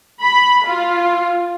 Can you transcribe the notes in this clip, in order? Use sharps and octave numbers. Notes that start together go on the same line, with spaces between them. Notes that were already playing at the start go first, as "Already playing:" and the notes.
B5
F4